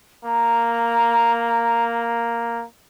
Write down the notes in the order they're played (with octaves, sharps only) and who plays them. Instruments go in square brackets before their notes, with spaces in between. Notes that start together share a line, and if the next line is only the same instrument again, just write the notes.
[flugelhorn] A#3 [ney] A#5